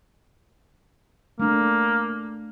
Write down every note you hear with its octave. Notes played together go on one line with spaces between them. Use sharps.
A3 A#3 D4